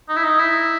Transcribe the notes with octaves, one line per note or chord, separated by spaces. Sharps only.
D#4
E4
D#4
E4